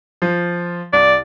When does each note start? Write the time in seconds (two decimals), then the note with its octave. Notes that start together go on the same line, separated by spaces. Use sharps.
0.22 F3 F4
0.93 C2 D5